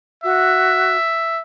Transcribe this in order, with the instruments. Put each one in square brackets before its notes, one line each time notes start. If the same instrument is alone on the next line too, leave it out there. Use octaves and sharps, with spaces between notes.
[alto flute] F#4 [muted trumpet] E5